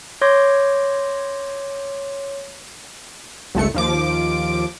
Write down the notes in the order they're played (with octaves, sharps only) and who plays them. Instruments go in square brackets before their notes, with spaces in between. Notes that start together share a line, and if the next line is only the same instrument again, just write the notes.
[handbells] C#5 C6 D6 G6 G#6 A#6
[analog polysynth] G1 C#2 A3 C#7
D#2 F3 D6